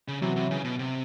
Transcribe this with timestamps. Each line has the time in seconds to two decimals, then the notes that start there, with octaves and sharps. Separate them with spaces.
0.08 C#3
0.21 C3 E3 F#3
0.36 C3
0.51 C#3
0.65 B2
0.79 C3